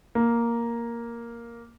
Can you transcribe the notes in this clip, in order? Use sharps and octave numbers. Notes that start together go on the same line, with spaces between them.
A#3